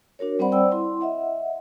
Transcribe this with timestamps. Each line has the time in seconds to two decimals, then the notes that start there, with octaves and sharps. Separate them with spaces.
0.19 D4 F#4 A#4 C#5
0.39 G3 C4 C5 D5 F#5 B5
0.52 C5 D5 G5 B5 E6
0.72 E4 C6
1.01 D#5 E5 F#5